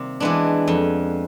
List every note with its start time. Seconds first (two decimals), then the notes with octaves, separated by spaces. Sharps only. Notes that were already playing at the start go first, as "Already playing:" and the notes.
Already playing: C3 D#3 G3 A#3
0.20 E3 G#3 B3 D4
0.68 F2